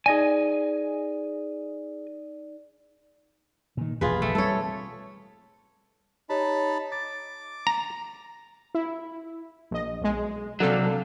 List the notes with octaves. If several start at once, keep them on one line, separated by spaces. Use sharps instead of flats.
D#4 G#4 D5 D#5 G#5
A#2 D#3
E1 A#1 F#2 F4 G#4 B4
A3
G3 B3 C4 A4 C#5
D#4 G4 C#5 A5 B5
D6 A6
A#5
E4
A#1 D#5
B1 G#3
C3 F#3 D4 A4 F5